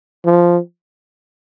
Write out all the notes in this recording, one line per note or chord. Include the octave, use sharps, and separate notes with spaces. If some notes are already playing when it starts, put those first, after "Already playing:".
F3